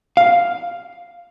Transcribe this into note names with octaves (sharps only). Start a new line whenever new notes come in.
F5